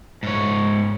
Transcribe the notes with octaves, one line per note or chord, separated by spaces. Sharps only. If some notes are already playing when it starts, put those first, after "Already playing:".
G#2 C#5